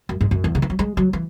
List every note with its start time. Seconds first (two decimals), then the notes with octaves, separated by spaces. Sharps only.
0.09 F#2
0.21 G#2
0.31 F#2
0.44 E2
0.55 C#3
0.62 E3
0.70 F#3
0.79 G#3
0.97 F#3
1.13 E3